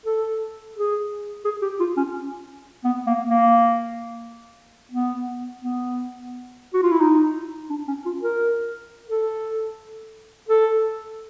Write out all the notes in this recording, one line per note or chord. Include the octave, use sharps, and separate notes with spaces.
A4
G#4
G#4
G4
F4
C#4
B3
A#3
A#3
B3
B3
F#4
F4
E4
D#4
D4
C#4
F4
A#4
A4
A4